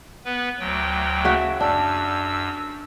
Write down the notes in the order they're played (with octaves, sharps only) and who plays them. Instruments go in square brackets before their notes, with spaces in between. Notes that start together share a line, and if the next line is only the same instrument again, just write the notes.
[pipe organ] B3 B4
D2 F#3 G5
[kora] C#3 F#4 E5
[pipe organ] F#2 E6 [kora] D4